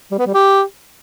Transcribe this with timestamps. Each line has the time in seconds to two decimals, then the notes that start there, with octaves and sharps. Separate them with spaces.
0.11 G3
0.19 B3
0.26 G3
0.34 G4